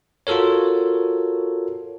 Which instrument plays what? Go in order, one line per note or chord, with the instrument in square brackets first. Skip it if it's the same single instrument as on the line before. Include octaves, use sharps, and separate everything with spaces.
[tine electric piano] F4 F#4 A4 A#4 C#5